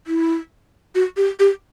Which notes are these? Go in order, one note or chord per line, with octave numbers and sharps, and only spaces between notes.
E4
F#4
G4
G4